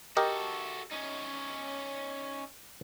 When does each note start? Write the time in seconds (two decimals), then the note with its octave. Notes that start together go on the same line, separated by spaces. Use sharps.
0.17 F#4 G4 A4 A#4 D#5
0.91 C#4 D#4